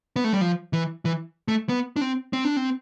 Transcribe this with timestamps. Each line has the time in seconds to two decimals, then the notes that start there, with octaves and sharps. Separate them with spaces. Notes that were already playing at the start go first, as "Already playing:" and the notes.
0.16 B3
0.24 A3
0.33 G3
0.41 F3
0.73 E3
1.05 E3
1.48 A3
1.69 B3
1.96 D4
2.01 C4
2.33 C4
2.45 D4
2.57 C4